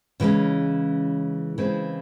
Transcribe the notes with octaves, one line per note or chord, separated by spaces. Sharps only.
C#3 E3 G#3 C#4
C#3 E3 G#3 C4